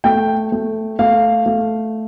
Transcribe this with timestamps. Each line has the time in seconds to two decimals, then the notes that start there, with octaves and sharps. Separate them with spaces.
0.04 A3 G5
0.52 A3
0.99 A3 F5
1.46 A3